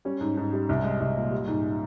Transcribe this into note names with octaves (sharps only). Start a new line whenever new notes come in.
G3 C#4
G#2
G#2
G3
C2
G#3
C2
A#2
G3
G#2